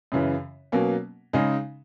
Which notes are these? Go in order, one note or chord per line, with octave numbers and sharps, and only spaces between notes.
F#2 C#3 E3
B2 F#3 A#3 C#4
C#3 G#3 D#4